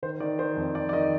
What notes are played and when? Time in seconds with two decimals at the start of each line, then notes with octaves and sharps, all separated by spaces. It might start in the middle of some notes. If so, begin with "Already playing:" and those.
0.03 D#3 C5
0.20 D#3 D5
0.39 D#3 C5
0.57 F2
0.75 F2 D5
0.89 D5
0.93 D#3 D#5